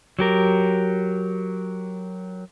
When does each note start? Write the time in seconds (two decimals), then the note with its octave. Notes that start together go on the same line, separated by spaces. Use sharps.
0.19 F#3 G4 A#4